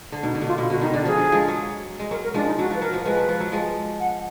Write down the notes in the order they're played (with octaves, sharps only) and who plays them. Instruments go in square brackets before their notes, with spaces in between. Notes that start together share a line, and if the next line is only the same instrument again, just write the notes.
[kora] D3
[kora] B2 [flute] D#4
[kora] D3
B2
[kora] A#2 [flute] F4
[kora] B2
[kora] D3 [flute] F#4
[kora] D#3 [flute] D#4
[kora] D3 [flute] D4
[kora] F3 [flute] G#4
[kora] F#3
F3 G#3
F#3
G#3
[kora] F#3 [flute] A#4
[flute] A#4
[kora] F3 G#3 [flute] D4
[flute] D#4
[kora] F#3 [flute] F#4
[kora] F3 [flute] B4
[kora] F#3 [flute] A#4
[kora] F3
[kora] F3 G#3 [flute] B4
[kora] F#3
F3
F#3
F3 G#3
[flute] F#5